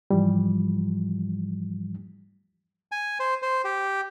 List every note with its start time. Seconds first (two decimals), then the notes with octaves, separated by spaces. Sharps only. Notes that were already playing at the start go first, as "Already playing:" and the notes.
0.11 G#2 E3 F3 G3
2.92 G#5
3.20 C5
3.42 C5
3.64 G4